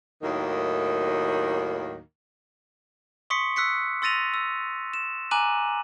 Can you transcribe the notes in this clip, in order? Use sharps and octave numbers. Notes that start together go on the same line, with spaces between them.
D#2 A2 D#3 F#3 A#3
C6 C#6 D#6 B6 C#7
E6 F#6 B6 C#7
C6 E6 A6 A#6 D#7 F7
E6
E7
G#5 A#5 D6 F#6 D#7 F#7